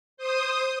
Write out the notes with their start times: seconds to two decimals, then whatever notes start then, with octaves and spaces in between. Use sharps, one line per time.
0.17 C5 D#6